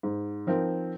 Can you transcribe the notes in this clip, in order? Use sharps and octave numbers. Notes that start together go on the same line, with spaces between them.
G#2
F3 C4 D#4 A#4